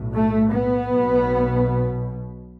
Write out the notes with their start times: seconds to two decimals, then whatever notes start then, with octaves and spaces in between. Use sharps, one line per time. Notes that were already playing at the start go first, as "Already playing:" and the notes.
Already playing: B1 A2
0.12 A3
0.51 B3
0.89 B1 B2